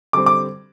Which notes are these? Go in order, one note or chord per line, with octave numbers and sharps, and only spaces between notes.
D3 G3 C4 D6
D6